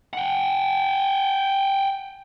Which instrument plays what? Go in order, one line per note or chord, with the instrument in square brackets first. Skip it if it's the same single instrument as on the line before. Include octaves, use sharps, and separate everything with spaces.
[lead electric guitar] F#5 G5